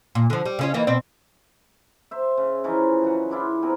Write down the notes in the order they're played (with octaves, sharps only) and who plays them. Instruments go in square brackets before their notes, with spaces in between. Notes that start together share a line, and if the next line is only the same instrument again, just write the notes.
[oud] A#2
D3 F3
G3
C#3 C#4 F4
E3 A#3 D#4
B2 C4 D5
[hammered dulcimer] C5 E5
C#3
E3 F3 C#4 D#4
C#3 F#3 F#5
E3 D4 E4 F4
B3 C4 G#4 A#4